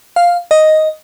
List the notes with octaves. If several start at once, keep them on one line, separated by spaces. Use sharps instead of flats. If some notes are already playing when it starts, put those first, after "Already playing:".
F5
D#5